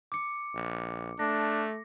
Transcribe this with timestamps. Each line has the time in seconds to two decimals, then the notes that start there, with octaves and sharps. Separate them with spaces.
0.12 D6 C#7
0.54 A#1
1.19 A3 D4 A#6